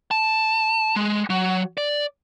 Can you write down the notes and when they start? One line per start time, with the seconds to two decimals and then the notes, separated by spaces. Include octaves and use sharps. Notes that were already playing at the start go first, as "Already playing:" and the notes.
0.11 A5
0.96 G#3
1.30 F#3
1.78 D5